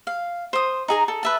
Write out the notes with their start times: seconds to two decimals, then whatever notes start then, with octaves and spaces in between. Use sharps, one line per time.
0.07 F5
0.53 C5 D#6
0.88 D#4 G#4 A#5
1.08 A4
1.23 B4 E5 A5